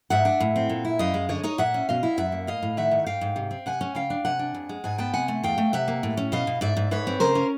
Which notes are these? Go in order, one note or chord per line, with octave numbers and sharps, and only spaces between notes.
G#2 E5 F#5
D4
A2
C4
A#2
E4
F#2 D#5 F5
G#3
D3 C#5 D#5
D#4 C#5 D#5
A#2 E5 F#5
C#4
B2 D#5 F5
E4
F#2 E5 F#5
A#3
A2 D#5 F5
A2
D#3 E5 F#5
D#3
G#2 F5 G5
G#2
C3
C4
C3 F#5 G#5
C#4
C#3 F5 G5
D4
C3 F#5 G#5
D4
F2
G#3
G#2 F#5 G#5
B3 G5 A5
C3 F#5 G#5
A3
E2 F5 G5
A3
C3 E5 F#5
A#3
A2
C#4
B2 D#5 F5
B2
G#2 D5 E5
G#2
G#2 B4 C#5
C4
C#3 A#4 C5
C#4